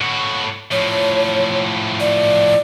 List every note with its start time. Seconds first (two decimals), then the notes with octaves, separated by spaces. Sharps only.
0.01 A2 F#4
0.72 A2 F3 C#5
2.00 D5